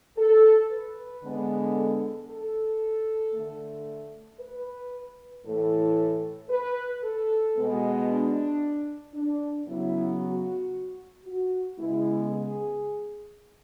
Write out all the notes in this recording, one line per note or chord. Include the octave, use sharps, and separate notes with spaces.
A4
B4
D3 G#3 B3
A4
A4
D3 A3
B4
A2 E3 A3 A4
B4
A4
B2 G#3 B3
D4
D4
C#3 F#3 B3 E4
F#4
F#4
C#3 G#3 B3 E4
G#4